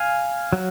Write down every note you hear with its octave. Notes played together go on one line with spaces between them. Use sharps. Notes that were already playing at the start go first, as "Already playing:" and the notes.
Already playing: F5 G#5
F#3